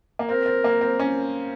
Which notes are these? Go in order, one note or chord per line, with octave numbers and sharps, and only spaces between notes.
A#3
C4 A#4
C4
A#3
C4
C#4